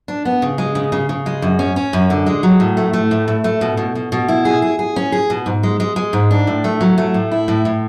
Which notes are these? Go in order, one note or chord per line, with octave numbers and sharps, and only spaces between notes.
D4
B3
C#3
G#3
C#3
C#3
C#3
G#3
F#2
C#4
C#4
F#2
D3
G#3
F#3
A2
A3
A3
A2
A2
A3
B2
B2
B2
B2
E4
G#4
G#4
G#4
C#4
G#4
B2
G#2
G#3
G#3
G#3
G#2
D4
A2
A3
F#3
A3
A2
E4
A2
A2